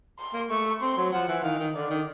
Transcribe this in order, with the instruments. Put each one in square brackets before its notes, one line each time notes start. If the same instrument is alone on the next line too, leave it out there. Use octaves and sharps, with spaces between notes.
[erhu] C6
[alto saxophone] A#3
[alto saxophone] A3 [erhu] C#6
[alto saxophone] C4 [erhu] C6
[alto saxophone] F#3
[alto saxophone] F3 [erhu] F#5
[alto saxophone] E3
[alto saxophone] D#3 [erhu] F5
[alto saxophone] D#3
[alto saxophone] D3 [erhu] D5
[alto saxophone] D#3